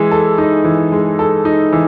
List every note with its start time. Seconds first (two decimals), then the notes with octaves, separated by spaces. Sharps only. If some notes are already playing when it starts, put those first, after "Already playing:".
Already playing: E3 G#3
0.11 A4
0.38 D#4
0.64 E3
0.92 G#3
1.19 A4
1.45 D#4
1.72 E3